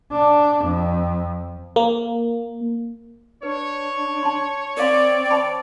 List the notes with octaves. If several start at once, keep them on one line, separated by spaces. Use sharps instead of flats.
D4
F2
A#3
D4 B4 C#5
A5 C6
C4 A#4 D5 F5 C6
C5 A5 B5